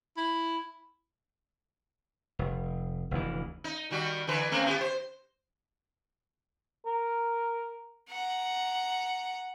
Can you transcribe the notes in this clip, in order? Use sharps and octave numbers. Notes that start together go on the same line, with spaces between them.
E4
F1
F1 D2 E3
D#4
D#3 G3 F#4
D3 E3 B4
A3 C4 C#4
B3 F4 G4
C5
A#4
F#5 A#5